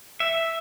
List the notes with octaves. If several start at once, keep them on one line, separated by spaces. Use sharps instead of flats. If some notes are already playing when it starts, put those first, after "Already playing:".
E5